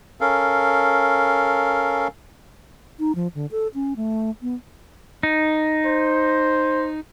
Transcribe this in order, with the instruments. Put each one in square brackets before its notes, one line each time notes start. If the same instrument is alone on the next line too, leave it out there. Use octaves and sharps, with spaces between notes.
[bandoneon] C#4 A4 A#4 F5
[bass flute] D#4
F3
D3
A4
C#4
A3
B3
[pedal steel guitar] D#4
[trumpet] C5